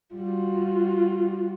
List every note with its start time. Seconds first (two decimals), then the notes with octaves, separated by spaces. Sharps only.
0.15 G3 F4 F#4